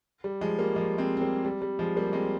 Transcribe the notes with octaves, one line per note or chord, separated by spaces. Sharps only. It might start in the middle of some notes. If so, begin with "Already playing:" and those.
G3
F3 G#3
G3 A#3
F3 G#3
G#3 C4
C4
G3 A#3
G3
G3
F3 G#3
G3 A#3
G#3 C4